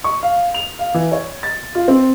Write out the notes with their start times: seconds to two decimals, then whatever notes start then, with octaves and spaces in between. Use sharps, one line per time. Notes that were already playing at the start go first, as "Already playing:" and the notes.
0.04 C#6
0.23 F5
0.54 F7
0.79 F5
0.94 E3
1.12 C#5
1.43 A6
1.75 F4
1.88 C4